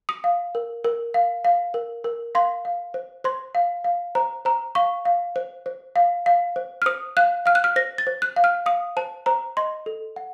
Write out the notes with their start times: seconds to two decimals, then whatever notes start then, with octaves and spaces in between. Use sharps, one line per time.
0.09 D#6
0.24 F5
0.55 A#4
0.84 A#4
1.14 F5
1.45 F5
1.74 A#4
2.04 A#4
2.35 F5 C6
2.65 F5
2.94 C5
3.24 C5 C6
3.55 F5
3.84 F5
4.15 C5 A#5
4.45 C5 A#5
4.75 F5 C#6
5.05 F5
5.36 C5
5.66 C5
5.96 F5
6.26 F5
6.56 C5
6.82 F6
6.86 C5 D#6
7.17 F5 F#6
7.46 F5 F6
7.55 F#6
7.64 F6
7.76 C5 A#6
7.98 A6
8.07 C5
8.22 F#6
8.36 F5
8.44 F6
8.66 F5 D#6
8.97 C5 A5
9.26 C5 A#5
9.57 D#5 C6
9.86 A4
10.16 F#5